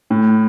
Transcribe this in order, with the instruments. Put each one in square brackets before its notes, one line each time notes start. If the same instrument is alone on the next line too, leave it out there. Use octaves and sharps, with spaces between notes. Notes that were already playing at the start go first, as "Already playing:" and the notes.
[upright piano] A2